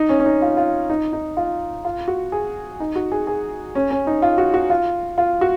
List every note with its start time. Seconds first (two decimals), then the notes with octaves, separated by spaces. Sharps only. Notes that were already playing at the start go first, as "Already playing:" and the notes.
Already playing: D#4
0.09 C#4
0.20 C#4
0.26 D#4
0.42 F4
0.57 F4
0.90 D#4
1.13 D#4
1.37 F4
1.85 F4
2.08 F#4
2.32 G#4
2.80 D#4
2.96 F#4
3.12 G#4
3.27 G#4
3.75 C#4
3.91 C#4
4.07 D#4
4.22 F4
4.38 F#4
4.54 F#4
4.70 F4
5.18 F4
5.41 F#4